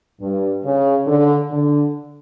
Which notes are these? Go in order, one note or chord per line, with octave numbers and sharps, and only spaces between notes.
G2
C#3
D3
D3